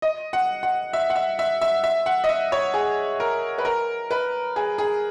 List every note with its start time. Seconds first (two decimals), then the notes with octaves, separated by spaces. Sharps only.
0.02 D#5
0.33 F#5
0.63 F#5
0.93 E5
1.10 F#5
1.16 E5
1.39 E5
1.61 E5
1.84 E5
2.06 F#5
2.24 D#5
2.29 E5
2.52 C#5
2.74 G#4
3.20 A#4
3.58 B4
3.65 A#4
4.11 B4
4.56 G#4
4.78 G#4